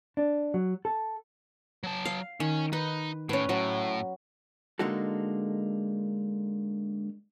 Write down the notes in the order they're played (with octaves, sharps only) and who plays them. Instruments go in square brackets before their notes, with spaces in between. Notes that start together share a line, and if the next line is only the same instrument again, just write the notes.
[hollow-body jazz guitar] D4
F#3
A4
[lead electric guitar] F#3 A5
[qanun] F5
[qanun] D#3 [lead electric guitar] C#4
[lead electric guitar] D#4 [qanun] B4
[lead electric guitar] A2 [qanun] C#4 B4
[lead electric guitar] A2 [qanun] F#3 F#4
[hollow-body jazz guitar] D3 G#3 A#3 D#4 F#4 A4